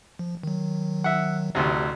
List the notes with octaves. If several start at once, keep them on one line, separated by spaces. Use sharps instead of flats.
F3
D#3 F#3
E5 F#5
A1 D2 C3